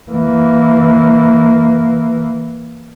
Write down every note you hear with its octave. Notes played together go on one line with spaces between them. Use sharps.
E3 A#3